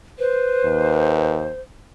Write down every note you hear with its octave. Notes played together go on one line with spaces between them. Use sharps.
B4 C5
D#2